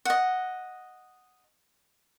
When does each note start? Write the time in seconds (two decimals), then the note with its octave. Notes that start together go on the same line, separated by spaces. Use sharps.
0.05 D#5 F#5